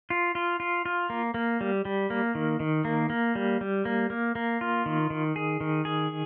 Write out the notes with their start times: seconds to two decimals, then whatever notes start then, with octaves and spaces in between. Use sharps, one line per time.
0.10 F4
0.35 F4
0.60 F4
0.85 F4
1.10 A#3
1.34 A#3
1.61 G3
1.85 G3
2.10 A#3
2.35 D#3
2.60 D#3
2.85 A#3
3.10 A#3
3.35 G3
3.61 G3
3.85 A#3
4.10 A#3
4.35 A#3
4.61 F4
4.86 D#3
5.10 D#3
5.36 G#4
5.61 D#3
5.85 G#4